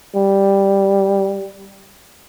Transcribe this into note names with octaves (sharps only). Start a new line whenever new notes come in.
G3